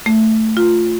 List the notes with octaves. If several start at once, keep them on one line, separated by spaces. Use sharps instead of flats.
A3
F4